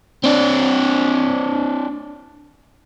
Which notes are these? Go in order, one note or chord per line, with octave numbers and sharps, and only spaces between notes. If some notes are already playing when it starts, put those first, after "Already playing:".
C4 D4